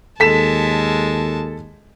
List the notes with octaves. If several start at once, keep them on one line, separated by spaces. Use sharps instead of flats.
D#2 G#3 A4 A5 B6 E7